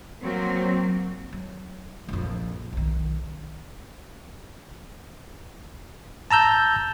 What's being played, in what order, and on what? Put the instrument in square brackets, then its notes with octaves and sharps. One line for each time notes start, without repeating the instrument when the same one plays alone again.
[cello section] F#3 A#3 C4
[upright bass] F#3
A#1 F2
B1 D#3
[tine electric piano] A5 A#5 E6 G6